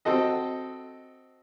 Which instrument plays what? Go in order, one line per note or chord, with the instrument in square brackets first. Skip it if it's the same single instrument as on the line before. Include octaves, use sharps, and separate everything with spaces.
[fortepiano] C4 F#4 A4 D#5